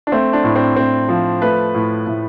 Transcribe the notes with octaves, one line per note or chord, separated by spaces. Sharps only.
D4
A3 C4
D4
A2
C4
A2 C4
F3
A3 B4
A2
A2